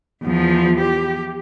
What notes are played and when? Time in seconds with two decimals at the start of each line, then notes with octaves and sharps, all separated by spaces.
0.23 E2 F3
0.79 G4